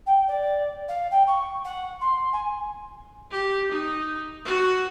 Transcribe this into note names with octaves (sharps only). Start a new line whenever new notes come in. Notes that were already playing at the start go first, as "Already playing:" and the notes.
G5
D5
F5
G5
C#6
F#5
C6
G#5
G4
D#4
F#4